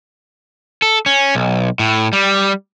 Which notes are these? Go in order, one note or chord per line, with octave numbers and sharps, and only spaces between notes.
A4
C#4
B1
A2
G3